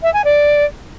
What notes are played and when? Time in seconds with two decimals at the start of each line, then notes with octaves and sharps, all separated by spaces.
0.02 E5
0.13 G#5
0.24 D5